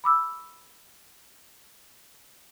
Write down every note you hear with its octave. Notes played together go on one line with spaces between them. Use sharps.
B5 D6 E6